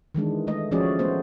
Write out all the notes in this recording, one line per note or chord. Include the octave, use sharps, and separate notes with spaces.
D#3 E3 G#3 D4
G#3 A3 D#5
F3 A3 C#4 F#4 G#4 D5
A3 B3 C5